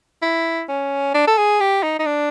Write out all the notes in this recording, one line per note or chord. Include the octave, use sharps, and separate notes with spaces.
E4
C#4
D4
A4
G#4
G4
D#4
D#4
D4